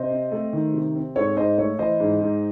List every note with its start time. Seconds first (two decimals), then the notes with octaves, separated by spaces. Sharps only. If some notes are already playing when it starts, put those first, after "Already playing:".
Already playing: C3 C5 D#5
0.11 C4
0.32 A3
0.53 D#3
0.74 C3
0.95 C4
1.15 G#2 A4 C#5
1.37 G#2 C5 D#5
1.58 A3 A4 C#5
1.79 E3 C5 D#5
2.00 G#2
2.21 G#2